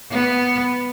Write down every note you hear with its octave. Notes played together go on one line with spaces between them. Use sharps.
B3